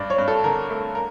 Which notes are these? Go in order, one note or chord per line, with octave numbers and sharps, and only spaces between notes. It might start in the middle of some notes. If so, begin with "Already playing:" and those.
Already playing: G2 D5
C#5
G2
A4
D3 A#4
A3
A#4